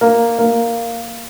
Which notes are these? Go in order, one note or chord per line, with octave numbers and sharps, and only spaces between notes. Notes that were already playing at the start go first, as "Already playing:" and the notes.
A#3
A#3